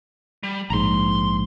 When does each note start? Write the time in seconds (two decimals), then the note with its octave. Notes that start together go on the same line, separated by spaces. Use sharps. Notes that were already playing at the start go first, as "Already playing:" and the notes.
0.43 G3
0.70 A#1 G#2 A#5 C6